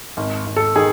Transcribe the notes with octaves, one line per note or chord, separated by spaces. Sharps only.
G#1
G#1
A4
D#3 G#4